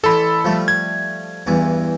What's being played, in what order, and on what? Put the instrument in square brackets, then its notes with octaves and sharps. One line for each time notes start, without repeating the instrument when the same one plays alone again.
[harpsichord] A1 C6 [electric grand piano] A4 B5
[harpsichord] F3 G3 A3
[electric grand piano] G#6
[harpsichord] E2 G2 E3